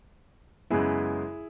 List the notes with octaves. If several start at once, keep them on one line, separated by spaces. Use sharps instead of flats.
F#2 C#3 G#3 B3 E4 G#4